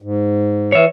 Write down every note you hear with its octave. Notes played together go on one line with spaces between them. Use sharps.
G#2
E3 C#5 E5